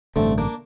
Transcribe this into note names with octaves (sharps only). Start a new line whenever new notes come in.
A1 G2 D3 A3 C4
A#3 D4